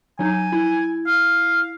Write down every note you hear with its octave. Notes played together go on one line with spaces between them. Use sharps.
F#3 D#4 G#5
E4
F5